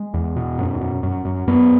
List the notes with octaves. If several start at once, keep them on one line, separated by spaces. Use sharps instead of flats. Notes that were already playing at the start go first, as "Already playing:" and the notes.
Already playing: G#3
E2
B2
F#2
F#2
F#2
F#2
F#2 B3